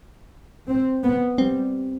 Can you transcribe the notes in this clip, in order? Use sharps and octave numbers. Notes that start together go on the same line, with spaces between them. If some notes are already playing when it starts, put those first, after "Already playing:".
C4
B3
G3 C4